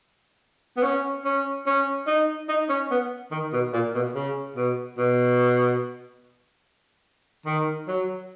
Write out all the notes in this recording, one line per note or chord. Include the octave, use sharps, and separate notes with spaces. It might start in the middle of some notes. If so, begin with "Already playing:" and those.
B3
C#4
C#4
C#4
D#4
D#4
C#4
B3
D#3
B2
A#2
B2
C#3
B2
B2
D#3
F#3